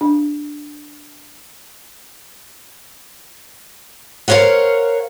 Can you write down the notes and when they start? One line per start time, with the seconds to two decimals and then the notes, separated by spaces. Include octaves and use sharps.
0.01 D4
4.28 A#4 C5 C#5 F5 F#5